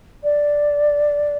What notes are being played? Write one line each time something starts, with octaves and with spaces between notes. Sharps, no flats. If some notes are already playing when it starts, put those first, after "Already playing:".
D5